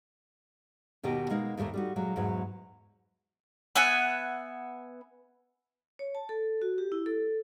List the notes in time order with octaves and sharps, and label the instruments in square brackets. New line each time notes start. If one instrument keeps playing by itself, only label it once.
[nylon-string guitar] D#2 B2 D#3 G4 D#5
B2 G#3 A#3 D#4 A#4
D#2 A2 G3 A3 A#3
G3 D#4 F#4
A#2 F#3 G#3
E2 G#2 B2 F#3
[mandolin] B3 E5 F#5 G#5
[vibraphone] C#5
A5
A4
F#4
G4
E4
A4